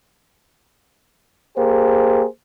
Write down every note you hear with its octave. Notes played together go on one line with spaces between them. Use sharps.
A#3 G4 G#4 C5